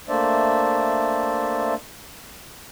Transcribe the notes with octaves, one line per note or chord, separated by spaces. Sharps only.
A3 A#3 D4 C5 D5 E5